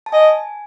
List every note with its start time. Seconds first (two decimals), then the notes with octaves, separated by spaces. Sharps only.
0.06 A5
0.12 D#5 G#5